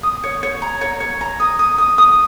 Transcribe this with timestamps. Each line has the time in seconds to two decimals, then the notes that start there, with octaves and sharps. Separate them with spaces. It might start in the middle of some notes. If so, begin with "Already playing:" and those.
0.03 D#6
0.24 C#5
0.43 C#5
0.62 A#5
0.81 C#5
1.00 C#5
1.21 A#5
1.40 D#6
1.59 D#6
1.78 D#6
1.98 D#6